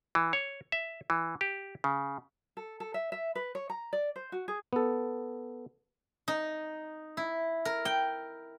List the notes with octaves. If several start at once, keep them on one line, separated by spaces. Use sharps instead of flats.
E3
C#5
E5
E3
G4
C#3
A4
A4
E5
E5
B4
C#5
A#5
D5
C5
F#4
G#4
B3 A4
D#4
E4
A#4
G5